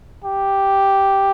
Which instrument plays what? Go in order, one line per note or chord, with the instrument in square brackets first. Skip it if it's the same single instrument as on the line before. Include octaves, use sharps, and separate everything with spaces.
[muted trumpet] G4